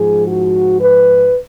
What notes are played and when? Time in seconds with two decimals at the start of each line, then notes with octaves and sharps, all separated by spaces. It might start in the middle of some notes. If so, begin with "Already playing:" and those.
Already playing: G#2 F3 G#4
0.27 F#4
0.80 B4